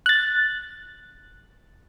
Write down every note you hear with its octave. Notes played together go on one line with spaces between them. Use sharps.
F#6 A6